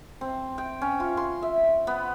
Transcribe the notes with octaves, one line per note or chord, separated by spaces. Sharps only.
C4
G5
C#4
F4
C6
E5
B3